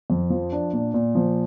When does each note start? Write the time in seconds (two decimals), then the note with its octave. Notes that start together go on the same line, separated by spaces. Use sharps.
0.10 F2
0.30 F3
0.52 D4
0.73 A#2
0.94 A#2
1.15 F3